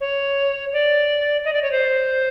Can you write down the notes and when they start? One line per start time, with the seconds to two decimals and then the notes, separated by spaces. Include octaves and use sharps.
0.01 C#5
0.73 D5
1.45 D#5
1.53 D5
1.63 C#5
1.72 C5